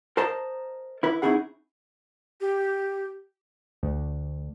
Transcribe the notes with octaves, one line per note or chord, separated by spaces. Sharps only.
A#4 C5 D#5 A5 A#5
E4 B4
C4 C#4 D#4 E4 G#4 F#5
G4
D2